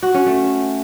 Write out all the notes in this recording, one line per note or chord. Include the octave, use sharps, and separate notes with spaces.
F#4
C#4
A3